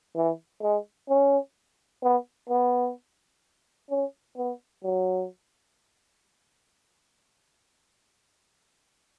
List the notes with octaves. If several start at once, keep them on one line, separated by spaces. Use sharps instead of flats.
E3
G#3
C#4
B3
B3
C#4
B3
F#3